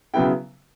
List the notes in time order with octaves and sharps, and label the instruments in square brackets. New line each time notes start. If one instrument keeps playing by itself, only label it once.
[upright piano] C#3 F#3 B3 E4 G5